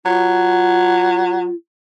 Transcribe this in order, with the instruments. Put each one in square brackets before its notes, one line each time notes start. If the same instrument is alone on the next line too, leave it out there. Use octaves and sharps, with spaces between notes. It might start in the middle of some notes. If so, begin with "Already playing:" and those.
[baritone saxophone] F#3 [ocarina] F4